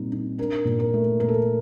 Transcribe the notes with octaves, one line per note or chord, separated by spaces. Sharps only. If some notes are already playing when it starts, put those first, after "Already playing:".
Already playing: A#2 G3 C4 D#4
D#4
D4 A#4
A#2
A#4
A3
A#2 A#4
A4